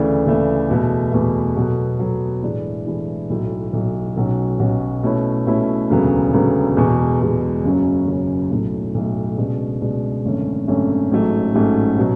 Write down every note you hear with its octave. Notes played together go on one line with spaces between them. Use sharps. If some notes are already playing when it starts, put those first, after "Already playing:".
Already playing: D2 C#3 E3 A3 D4
D2 C#3 E3 A3 D4
E2 B2 A3
E2 B2 A3
B2 F#3 B3 F#4 A4
B2 F#3 B3 F#4 A4
A2 E3 G#3 D4
A2 E3 G#3 D4
B1 A2 F#3
B1 A2 F#3
B1 B2 F#3 C#4 F#4
B1 B2 F#3 C#4 F#4
B2 A3 C#4 E4
B2 A3 C#4 E4
E1 D2 C#3 F#3 B3
E1 D2 C#3 F#3 B3
E2 B2 G#3
E2 B2 G#3
F#1 F#2 C#3 F#3 C#4
F#1 F#2 C#3 F#3 C#4
B1 A2 F#3 A3
B1 A2 F#3 A3
C#2 B2 G#3 D4
C#2 B2 G#3 D4
G#1 F#2 D3 A3 C#4
G#1 F#2 D3 A3 C#4
A1 G#2 F#3 A3
A1 G#2 F#3 A3
B2 F#3